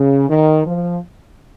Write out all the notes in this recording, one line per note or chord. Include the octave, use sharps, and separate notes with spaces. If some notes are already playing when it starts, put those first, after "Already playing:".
Already playing: C#3
D#3
F3